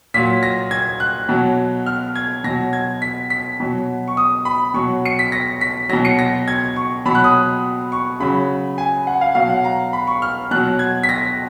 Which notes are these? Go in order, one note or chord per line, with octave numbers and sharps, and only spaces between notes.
A#2 F#3 B6
A#6
G#6
F#6
B2 F#3
F6
G#6
B2 F#3 A#6
G#6
B6
B6
B2 F#3
C#6
D#6
B5
B2 F#3 C#6
C#7
B6
A#6
B6
B2 F#3 A#6
C#7
A#6
G#6
C#6
B2 F#3 B5
F#6
D#6
C#6
C#3 F#3 B5
G#5
F#5
F5
B2 F#3 F5
F#5
A#5
B5
C#6
F6
B2 F#3 F#6
G#6
B6
A#6